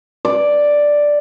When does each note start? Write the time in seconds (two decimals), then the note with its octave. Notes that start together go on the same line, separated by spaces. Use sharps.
0.25 D5